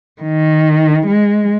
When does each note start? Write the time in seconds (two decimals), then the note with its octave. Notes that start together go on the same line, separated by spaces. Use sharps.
0.22 D#3
1.06 G#3